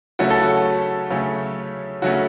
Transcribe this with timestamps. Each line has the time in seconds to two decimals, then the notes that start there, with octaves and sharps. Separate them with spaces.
0.19 C#3 F#3 A3 C#4 F#4
0.30 A4
0.41 F#4
1.10 C#3 F#3 A3 C#4
2.02 C#3 F#3 A3 C#4 F#4